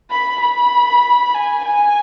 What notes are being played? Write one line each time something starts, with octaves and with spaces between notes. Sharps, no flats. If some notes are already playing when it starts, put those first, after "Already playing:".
B5
B5
G#5
G#5